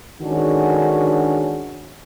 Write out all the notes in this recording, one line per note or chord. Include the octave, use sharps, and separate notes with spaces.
D3 D#3 G#3 C#4 D4 F#4